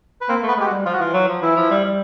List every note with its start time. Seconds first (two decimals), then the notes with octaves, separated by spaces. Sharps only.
0.21 B4
0.29 A#3 C4 C5
0.43 A3 B3 B4
0.57 G#3 G4
0.66 F#4
0.71 G3
0.85 F3 F4
0.93 F#4
1.00 E3 F4
1.14 F#3
1.28 F3
1.42 E3 E4
1.56 F3
1.70 G3
1.84 G3